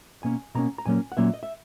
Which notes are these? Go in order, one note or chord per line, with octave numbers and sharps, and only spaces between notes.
B2 A#3 C#4 G#5
B2 A#3 C#4 A#5
A#5
A#2 F#3 A#3 C#4 G#5
F#5
A#2 F#3 A#3 C#4 E5
D#5
E5